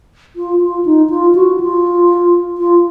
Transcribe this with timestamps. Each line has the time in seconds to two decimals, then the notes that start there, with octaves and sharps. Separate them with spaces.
0.36 F4
0.61 F4
0.85 D#4
1.10 F4
1.35 F#4
1.60 F4
2.58 F4